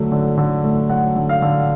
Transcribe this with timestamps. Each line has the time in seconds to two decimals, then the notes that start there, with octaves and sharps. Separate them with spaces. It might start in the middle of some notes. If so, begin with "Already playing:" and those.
Already playing: D3 F#3 A3
0.12 D3
0.37 D3
0.64 A3
0.90 F#3 F#5
1.16 D3
1.29 F5
1.42 D3